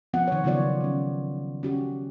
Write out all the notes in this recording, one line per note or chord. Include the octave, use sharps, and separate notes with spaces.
F3 B3 C4 F4 F#5
D#3 C#5
C#3 F#3 B3 F4 C#5 D5
G3 C#4
C#4 F#4 G4